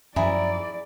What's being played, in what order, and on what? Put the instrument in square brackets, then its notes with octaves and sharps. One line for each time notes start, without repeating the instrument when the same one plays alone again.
[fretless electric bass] F#2 F3 [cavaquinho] E4 G#4 A#5 [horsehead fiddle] D5